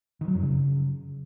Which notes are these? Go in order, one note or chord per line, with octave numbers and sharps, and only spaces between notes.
D#3
F#3
F#2
C#3